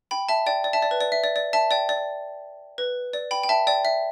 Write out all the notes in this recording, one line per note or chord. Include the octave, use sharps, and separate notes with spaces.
G5 B5
E5 A5
D5 G5
D5
E5 A5
D5
B4
D5
E5
D5
D5
E5 A5
D5 G5
D5
B4
D5
G5 B5
G5
E5 A5
D5 G5
E5